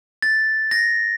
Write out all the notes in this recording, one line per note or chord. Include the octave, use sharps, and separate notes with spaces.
A6
A#6